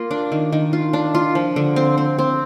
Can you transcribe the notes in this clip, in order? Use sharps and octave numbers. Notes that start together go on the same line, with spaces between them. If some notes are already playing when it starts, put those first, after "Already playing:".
Already playing: A#3 F4
D4
D#3
D#3
F4
D4
F4
F3
D3
C4
C4
C4